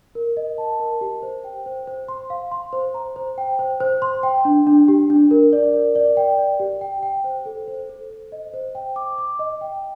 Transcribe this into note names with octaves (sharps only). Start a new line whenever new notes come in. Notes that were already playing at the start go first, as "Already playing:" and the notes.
A#4
D#5
A5
A#4
G4
C5
G5
C5
C5
C6
F5
C6
C5
A#5
C5
G5
C5
C5
C6
G5
D4
D4
G4
D4
A#4
D5
A#4
D5
G5
D5
G4
G5
G5
C5
A4
C5
A4
C5
D#5
C5
G5
D6
D6
D#5
G5